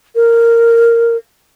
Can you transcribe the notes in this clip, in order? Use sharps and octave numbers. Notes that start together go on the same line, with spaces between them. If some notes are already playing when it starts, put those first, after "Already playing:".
A#4